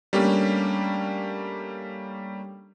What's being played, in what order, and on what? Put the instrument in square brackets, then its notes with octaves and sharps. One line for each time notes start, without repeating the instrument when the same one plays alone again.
[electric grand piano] G3 A3 A#3 C#4 D4 G4